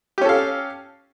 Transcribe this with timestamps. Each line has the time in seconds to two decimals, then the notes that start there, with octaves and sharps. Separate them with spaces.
0.18 G4
0.21 C#4
0.25 A4
0.29 F5